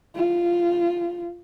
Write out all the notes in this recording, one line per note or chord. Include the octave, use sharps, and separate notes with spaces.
F4